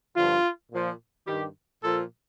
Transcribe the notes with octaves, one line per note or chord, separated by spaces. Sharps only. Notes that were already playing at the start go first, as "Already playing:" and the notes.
G2 D3 F3 F4
A#2 F3
G2 D#3 G4
A#2 F3 A4